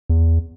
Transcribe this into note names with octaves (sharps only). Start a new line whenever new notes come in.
E2